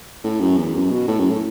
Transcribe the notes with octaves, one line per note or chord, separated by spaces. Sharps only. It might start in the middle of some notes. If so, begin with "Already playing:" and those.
A2
F#2
E2
F#2
B2
A2
F#2
A2